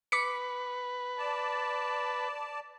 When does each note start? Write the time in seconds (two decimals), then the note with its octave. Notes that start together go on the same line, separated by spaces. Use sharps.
0.12 B4 D6 B6 C#7
1.18 D5 A5